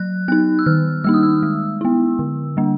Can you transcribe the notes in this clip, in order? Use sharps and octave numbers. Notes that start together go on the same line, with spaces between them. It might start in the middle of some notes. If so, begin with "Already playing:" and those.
Already playing: F#3 F#6
B3 D#4 F#6
E6
D#3 F6
G3 A#3 D#4 E6
D#6
E6
G#3
B3 E4
D3
G3 A#3 D4